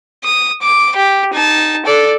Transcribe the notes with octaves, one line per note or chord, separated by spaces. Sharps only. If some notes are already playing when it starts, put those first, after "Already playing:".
D#6
D6
G4
D#4 A5
A4 D5